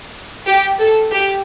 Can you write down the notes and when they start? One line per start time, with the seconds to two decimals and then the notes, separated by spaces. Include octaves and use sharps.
0.47 G4
0.80 A4
1.12 G4